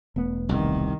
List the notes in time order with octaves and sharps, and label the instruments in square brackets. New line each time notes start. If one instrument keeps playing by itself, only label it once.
[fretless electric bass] E1 A3 B3
[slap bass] C2 [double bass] D#3